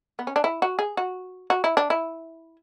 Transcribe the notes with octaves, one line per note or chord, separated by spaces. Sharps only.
B3
C#4
D4
E4
F#4
G#4
F#4
F#4
E4
D4
E4